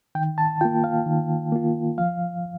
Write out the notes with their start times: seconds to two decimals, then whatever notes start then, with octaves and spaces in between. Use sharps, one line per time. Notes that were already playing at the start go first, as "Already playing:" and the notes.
0.15 D#3 G5
0.38 A5
0.61 A#3 F4 G5
0.84 F5
1.06 D#3
1.52 A#3 F4
1.98 F3 F5